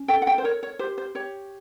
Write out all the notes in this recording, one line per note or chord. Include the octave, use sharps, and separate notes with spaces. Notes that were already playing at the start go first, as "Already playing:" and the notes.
Already playing: C#4
A4 G5
F#5
G5
C5
A#4 C#5
C#5
G4 C5
C5
G4 C#5